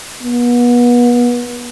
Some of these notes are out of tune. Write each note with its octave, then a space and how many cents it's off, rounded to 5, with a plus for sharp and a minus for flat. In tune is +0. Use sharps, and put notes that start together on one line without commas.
B3 -30